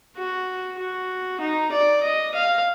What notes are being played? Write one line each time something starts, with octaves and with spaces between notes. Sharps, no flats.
F#4
F#4
D#4
D5
D#5
F5